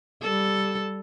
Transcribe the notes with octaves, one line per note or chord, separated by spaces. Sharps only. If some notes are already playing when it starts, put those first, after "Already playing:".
G3 A4